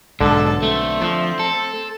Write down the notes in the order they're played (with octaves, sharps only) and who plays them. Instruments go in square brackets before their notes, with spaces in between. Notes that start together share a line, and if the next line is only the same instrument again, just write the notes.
[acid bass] B1 [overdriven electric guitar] G#2 [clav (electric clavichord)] D3 [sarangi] A4
[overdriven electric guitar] A3 [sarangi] C4
[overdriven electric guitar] F3 [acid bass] A3
[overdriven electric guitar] A4